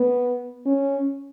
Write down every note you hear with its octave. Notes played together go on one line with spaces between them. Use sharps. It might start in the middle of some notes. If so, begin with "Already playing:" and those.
Already playing: B3
C#4